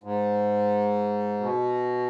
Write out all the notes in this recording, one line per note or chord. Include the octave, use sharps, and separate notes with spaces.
G#2
B2